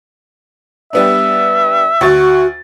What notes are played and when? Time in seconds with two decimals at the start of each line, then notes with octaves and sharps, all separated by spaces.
0.93 G3 B3 D4 E5
2.01 D2 F#4 C#6 A6